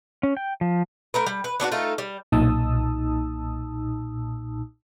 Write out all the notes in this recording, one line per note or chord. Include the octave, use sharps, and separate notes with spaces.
C#4
G5
F3
A3 A#4 B4
G3
B4
B3 D4 F4 F#4
A3 D#4 F4 A4
G3
B1 A#2 D#4 A5 D#6 E6